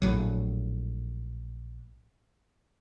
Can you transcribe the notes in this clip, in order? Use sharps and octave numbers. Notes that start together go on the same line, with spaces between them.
A#1 A2 F#3